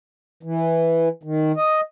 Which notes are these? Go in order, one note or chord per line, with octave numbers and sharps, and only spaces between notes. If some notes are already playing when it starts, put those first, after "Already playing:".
E3
D#3
D#5